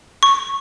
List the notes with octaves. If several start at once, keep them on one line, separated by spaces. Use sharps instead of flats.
C#6